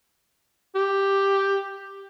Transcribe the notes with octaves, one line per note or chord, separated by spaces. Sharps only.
G4